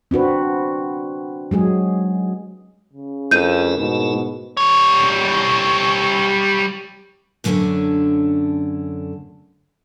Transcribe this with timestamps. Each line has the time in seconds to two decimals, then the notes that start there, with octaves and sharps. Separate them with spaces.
0.11 C4 D4 F#4 B4
1.51 F#3 G#3 G#4
2.93 C#3
3.31 F2 A3 E4 A#4 G6 D#7
3.78 G#2 B2
4.57 G3 C#5
7.44 F#2 D3 A3 A#3 C#4 D4